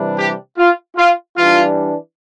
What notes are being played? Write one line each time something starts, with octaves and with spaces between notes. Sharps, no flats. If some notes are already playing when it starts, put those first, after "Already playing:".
Already playing: C3 E3 G3 D4
G4
F4
F4
E3 G3 D4 F4